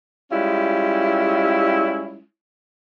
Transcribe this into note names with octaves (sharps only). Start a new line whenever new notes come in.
G3 G#3 C#4 E4 F4